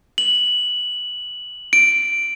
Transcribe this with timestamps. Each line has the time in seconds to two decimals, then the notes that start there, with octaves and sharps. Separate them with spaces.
0.18 F#7
1.73 D7